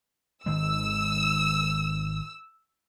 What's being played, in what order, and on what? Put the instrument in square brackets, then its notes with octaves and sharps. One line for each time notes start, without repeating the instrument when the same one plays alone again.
[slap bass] G#1 D#3 G#3 [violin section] E6